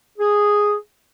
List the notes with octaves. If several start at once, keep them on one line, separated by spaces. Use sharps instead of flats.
G#4